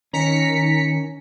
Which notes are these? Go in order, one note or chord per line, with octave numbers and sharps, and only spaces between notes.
D#3 C#4 A#5 B6 C#7